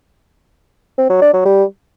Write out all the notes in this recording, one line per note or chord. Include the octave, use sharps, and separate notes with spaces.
C4
F#3
D4
F#3
G3